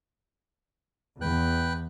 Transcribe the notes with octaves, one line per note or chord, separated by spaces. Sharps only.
E2 E3 B4 G5 F#6